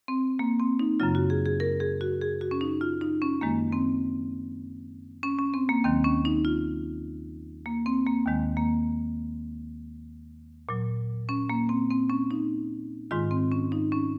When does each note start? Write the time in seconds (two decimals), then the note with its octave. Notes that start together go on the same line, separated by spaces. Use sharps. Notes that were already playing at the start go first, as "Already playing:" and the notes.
0.08 C4
0.39 A#3
0.60 C4
0.79 D#4
1.00 F#2 C#3 F#3 F4
1.15 F#4
1.30 G#4
1.46 G#4
1.60 A#4
1.80 G#4
2.01 F#4
2.21 G#4
2.41 F#4
2.51 C#4
2.61 D#4
2.81 F4
3.01 D#4
3.22 C#4
3.41 F#2 D#3 G#3 A#3
3.72 C4
5.23 C#4
5.39 C#4
5.54 C4
5.69 A#3
5.84 D#2 D#3 F#3 C4
6.04 C#4
6.25 D#4
6.45 F4
7.66 A#3
7.86 C4
8.06 A#3
8.26 D#2 D#3 G#3
8.57 A#3
10.69 A#2 F#3
11.29 C#4
11.50 A#3
11.69 C4
11.91 C4
12.10 C#4
12.31 D#4
13.11 G#2 D#3 G#3 F4
13.31 C4
13.52 C#4
13.72 D#4
13.92 C#4